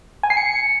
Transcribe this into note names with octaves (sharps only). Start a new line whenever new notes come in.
G#5
C7
C#7